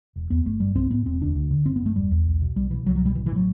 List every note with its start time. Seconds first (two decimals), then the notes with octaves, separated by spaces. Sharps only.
0.16 E1
0.30 E2 B3
0.45 G1 A3
0.60 G2 G3
0.75 B1 C4
0.91 A2 B3
1.06 E1 C4
1.21 D2 D4
1.35 D2
1.51 D3
1.66 G1 C4
1.76 B3
1.81 G2 A3
1.95 E1 G3
2.11 E2
2.26 B1
2.41 B2
2.56 B1 G3
2.70 B2 E3
2.85 C2 F#3
2.95 F#3
3.01 B2 G3
3.15 A1 E3
3.26 E3
3.31 A2 F#3